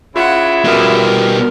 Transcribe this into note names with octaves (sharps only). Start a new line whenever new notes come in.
C#3 E4 F4 E5 F#5
B2 G3 A#4